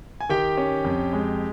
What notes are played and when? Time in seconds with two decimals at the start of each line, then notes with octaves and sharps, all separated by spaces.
0.20 G#5
0.29 D#3 G4 G5
0.57 C#4
0.85 F2
1.13 G#3